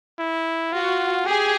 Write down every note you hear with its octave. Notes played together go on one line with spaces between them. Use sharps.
E4
F4 F#4
G4 G#4